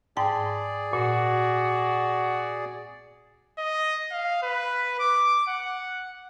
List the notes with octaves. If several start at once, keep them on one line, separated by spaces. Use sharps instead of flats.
G#2 G#4 D5 G5 A5
A#2 F#4
D#5
F5
B4
D6
F#5